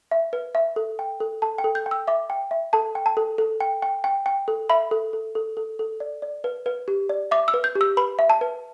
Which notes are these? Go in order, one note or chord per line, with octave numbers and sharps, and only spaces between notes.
E5
B4
E5
A4
G5
A4
A4 A5
G5
A4
G6
G5
E6
E5 D6
G5
E5
A4 A5
G5
A5
A4
A4
G5
G5
G5
G5
A4
E5 B5
A4
A4
A4
A4
A4
D5
D5
B4
B4
G4
D5
E5 D6
E6
B4
G6
G4
E6
B4 B5
E5
A5
B4